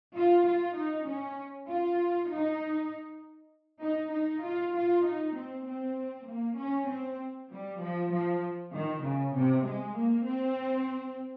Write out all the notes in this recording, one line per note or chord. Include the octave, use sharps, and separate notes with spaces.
F4
F4
D#4
C#4
F4
D#4
D#4
D#4
F4
F4
D#4
C4
C4
A#3
C#4
C4
G3
F3
F3
D#3
C#3
C3
G#3
A#3
C4